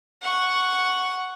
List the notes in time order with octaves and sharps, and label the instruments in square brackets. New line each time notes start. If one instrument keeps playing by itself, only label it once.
[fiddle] F#5 C#6